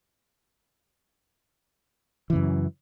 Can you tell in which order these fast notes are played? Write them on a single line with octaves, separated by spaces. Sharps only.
E3 C#3 F#2